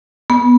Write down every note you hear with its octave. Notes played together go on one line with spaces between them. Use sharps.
B3